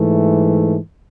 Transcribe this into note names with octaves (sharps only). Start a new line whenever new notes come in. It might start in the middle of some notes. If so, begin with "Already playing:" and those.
Already playing: G#2 E3 A3